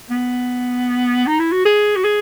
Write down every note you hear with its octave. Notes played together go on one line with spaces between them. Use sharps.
B3
D#4
E4
F#4
G#4
F#4
G#4